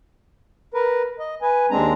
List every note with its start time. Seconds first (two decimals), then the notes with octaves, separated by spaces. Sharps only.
0.74 A#4 B4
1.19 D#5
1.42 B4 G#5
1.71 D#2 G#3 C4 D4 A#5